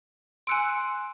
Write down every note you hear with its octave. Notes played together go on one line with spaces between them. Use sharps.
G#5 C6 E6 F#6 C#7 D7